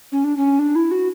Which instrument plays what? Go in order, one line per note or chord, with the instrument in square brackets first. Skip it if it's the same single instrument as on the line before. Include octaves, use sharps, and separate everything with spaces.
[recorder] C#4
D4
C#4
D4
E4
F#4